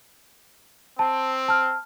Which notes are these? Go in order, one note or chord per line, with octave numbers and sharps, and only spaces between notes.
C4 A5
A5 F6